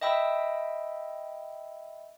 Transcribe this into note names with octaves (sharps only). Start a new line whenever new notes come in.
D#5 E5 G5 B5 E6